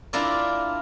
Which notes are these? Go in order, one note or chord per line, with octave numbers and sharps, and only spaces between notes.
A#3 D4 E4 F4 A#4 D5